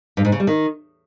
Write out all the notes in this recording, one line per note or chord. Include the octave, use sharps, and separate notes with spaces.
G2
G#2
C#3
G3
D#3